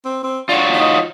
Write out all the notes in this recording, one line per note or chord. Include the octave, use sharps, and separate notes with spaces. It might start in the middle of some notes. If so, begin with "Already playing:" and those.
C4
C4
D4 F4 F#4 C#5
D#4